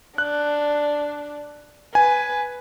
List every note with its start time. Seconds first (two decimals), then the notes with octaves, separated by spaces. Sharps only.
0.18 D4 F#6
1.95 B4 G#5